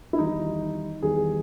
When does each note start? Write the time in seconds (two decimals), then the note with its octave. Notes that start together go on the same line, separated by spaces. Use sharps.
0.13 E4
0.18 E2 D#3 G3 D#4
1.02 E2 D#3 G3 G#4